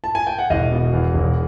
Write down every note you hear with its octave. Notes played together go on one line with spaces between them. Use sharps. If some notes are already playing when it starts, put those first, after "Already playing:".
A5
G#5
G5
F#5
E1 D#5 F5
B2
E2
E1